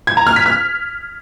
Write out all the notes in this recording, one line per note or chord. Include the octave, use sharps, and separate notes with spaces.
G#6
A#5
F6
B6
F6